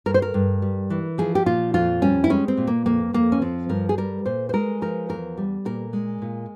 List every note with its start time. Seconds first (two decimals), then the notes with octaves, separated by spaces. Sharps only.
0.06 G2 A#4
0.14 C5
0.22 A#4
0.34 G2
0.62 G3
0.90 E3
1.18 F3 G#4
1.35 G4
1.46 A#2 F4
1.74 F2 F4
2.02 G3 C#4
2.24 E4
2.30 G#3 C#4
2.48 C4
2.57 A#2
2.67 A#3
2.86 F2 A#3
3.13 F2 A#3
3.32 C#4
3.42 F3 C4
3.69 G2 A#4
3.89 G#4
3.98 G3 A#4
4.26 A#2 C5
4.49 C5
4.53 G#3 A#4
4.82 F3 A#4
5.09 E2 A#4
5.37 G3
5.65 A#2 A#4
5.93 G#3
6.22 A#2